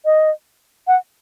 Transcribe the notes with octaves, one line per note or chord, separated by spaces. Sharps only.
D#5
F#5